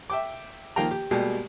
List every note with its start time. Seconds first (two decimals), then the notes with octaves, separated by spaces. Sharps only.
0.10 E5 G5 D6
0.76 D#3 F3 A#3 F5 G5 A#5
0.91 G4
1.11 B2 G3 G#3 A#3 G4